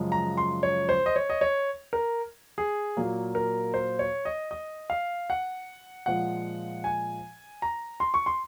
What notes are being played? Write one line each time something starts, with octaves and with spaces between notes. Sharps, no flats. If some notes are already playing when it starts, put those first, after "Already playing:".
Already playing: F#2 C#3 F3 G#3
A#5
C6
C#5
C5
D#5
C#5
D#5
C#5
A#4
G#4
A#2 F#3 A#3
A#4
C5
C#5
D#5
D#5
F5
F#5
A#2 F3 G#3 F#5
G#5
A#5
C6
C#6
C6